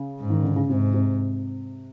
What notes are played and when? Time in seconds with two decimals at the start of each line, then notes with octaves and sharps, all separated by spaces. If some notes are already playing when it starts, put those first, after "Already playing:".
Already playing: C#3
0.19 G#2
0.30 D#3
0.43 D3
0.56 C#3
0.69 G#2 C3
0.94 C3